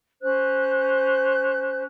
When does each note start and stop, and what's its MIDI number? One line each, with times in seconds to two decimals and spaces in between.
0.22 1.84 61
0.22 1.84 72
0.22 1.84 90